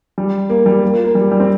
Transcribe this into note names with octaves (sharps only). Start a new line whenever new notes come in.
G3
A#3
G3
A#3
F4
A#3
G3
G3
C4